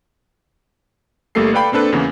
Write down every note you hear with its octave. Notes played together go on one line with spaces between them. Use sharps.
G1 G3 A3 A#3 A4 C7
A4 B4 D5 F5 G5 B5
A#3 C4 D4 A4 B4
E2 C#3 E3 A#3 B3